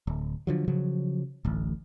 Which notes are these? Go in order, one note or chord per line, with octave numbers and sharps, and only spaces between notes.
D1
D3 F3 F#3
C#3 F3 F#3
D1 A1